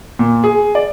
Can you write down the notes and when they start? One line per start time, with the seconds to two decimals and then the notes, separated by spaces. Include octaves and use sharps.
0.19 A#2
0.44 G#4
0.75 D5